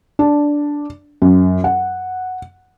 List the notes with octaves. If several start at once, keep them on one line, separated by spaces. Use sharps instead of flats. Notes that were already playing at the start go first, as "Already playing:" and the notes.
D4
F#2
F#5